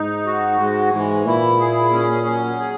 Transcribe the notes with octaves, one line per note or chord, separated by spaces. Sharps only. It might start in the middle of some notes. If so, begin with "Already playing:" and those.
Already playing: G#2 D#4
F#4
G#2 G#3
G#2 E3
A#2 E4
G#4
C#4
F#3
G#4